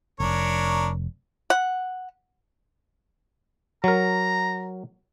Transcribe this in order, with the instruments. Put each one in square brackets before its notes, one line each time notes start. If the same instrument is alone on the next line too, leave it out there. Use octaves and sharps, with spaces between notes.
[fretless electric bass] F1 [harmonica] D4 A#4 C#5
[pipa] F#5
[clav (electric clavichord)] F#3 A#4 [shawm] A#5